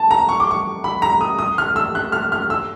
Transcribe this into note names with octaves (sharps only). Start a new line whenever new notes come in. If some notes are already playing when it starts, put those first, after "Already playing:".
Already playing: A5
A#5
C#6
D6
C#6
B5
A#5
D#6
D#6
F6
E6
F#6
F6
F6
E6